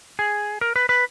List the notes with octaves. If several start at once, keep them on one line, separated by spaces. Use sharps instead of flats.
G#4
A#4
B4
B4